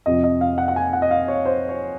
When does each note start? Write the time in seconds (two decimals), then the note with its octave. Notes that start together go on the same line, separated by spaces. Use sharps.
0.06 F2 C3 F3 D#5
0.24 D#5
0.41 F5
0.58 F#5
0.68 F#5
0.76 G#5
0.93 F#5
1.02 D#5
1.11 F5
1.28 C#5
1.46 C5
1.69 C#5